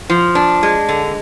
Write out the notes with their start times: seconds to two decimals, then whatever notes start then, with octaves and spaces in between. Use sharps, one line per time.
0.09 F3
0.35 D4
0.63 G#3
0.89 D3